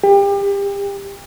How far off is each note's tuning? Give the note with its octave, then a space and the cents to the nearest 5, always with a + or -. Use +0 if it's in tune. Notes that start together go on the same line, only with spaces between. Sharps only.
G4 +30